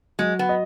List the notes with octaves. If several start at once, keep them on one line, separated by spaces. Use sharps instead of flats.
F#3 G#3
B3
D#5